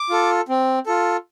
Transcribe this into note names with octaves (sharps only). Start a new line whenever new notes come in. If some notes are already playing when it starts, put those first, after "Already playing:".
Already playing: D6
F4 A4
C4
F4 A4